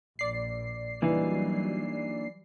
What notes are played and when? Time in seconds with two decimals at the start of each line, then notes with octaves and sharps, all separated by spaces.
0.19 A#1 D5 C7
1.02 E3 F#3 G3 A#3 D4 D#4